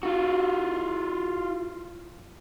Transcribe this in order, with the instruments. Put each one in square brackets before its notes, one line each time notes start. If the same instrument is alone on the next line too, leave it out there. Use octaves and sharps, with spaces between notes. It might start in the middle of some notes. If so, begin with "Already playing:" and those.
[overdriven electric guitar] F4 F#4